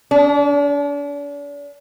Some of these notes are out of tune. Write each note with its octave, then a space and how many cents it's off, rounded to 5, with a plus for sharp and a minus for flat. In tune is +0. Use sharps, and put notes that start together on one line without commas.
D4 -40